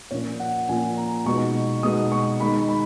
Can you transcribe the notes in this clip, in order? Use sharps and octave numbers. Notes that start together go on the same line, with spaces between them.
A#2 F3 A#3 C#4 C#5
F#5
A#2 F3 A#3 C#4 G#5
A#5
B2 G#3 B3 D#4 C#6
B2 G#3 B3 D#4 D#6
C#6
D#3 G#3 D#4 B5
B5